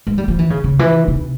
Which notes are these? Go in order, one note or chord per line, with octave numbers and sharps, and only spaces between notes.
G#3
G3
F3
E3
C#3
C#3
E3
C3